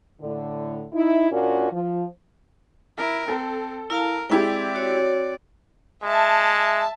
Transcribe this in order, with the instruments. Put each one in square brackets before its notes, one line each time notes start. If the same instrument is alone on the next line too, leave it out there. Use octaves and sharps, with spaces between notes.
[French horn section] A2 D3
D#4 E4
A#2 A#3 C#4 D4 F4 F#4
F3
[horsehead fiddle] E4 A#4
[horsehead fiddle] C4 [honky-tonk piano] A4
[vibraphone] E4 F5 A5 [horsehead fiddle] A#4
[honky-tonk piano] G#3 E4 G4 [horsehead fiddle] C4 D5 [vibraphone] G5
[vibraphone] F#4 C#5
[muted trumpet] G#3 [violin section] E5 A5